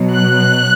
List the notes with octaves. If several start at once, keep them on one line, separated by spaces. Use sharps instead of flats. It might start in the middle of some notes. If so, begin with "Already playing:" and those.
Already playing: B2 F#3
F#6